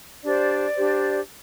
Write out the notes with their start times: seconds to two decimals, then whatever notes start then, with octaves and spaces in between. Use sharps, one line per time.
0.23 D4 G4 C5 D5
0.76 D4 G4 C5